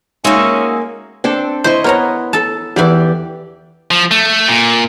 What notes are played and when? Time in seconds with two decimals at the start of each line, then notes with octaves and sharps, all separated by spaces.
0.24 G#3 A#3 C#4 D#4 F#4 E5
1.24 C4 D4 A4
1.64 E4 C5 D#5 C#6
1.84 B3 A#4 C#5 A#5
2.33 A4 A5
2.76 E2 E3 G4 D5
3.91 F3
4.11 A3
4.48 A#2